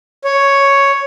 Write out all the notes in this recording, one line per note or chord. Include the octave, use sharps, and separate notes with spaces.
C#5